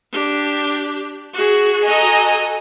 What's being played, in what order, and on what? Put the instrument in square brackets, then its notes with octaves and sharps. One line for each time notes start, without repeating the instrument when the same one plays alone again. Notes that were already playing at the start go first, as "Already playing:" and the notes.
[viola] D4 G4
F#4 G#4
[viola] F#4 A4 [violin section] D#5 G#5 A#5